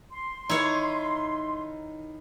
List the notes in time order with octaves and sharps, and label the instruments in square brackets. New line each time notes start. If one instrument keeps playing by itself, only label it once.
[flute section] C6
[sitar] D#3 D#4 [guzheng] E4 C#5